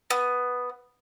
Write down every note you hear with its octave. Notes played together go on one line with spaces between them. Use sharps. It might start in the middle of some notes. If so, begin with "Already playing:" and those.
B3